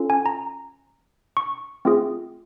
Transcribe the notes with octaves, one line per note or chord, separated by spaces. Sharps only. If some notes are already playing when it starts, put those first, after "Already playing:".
Already playing: C#4 F4 A4
G#5
A#5
C#6
A3 C4 F4 G#4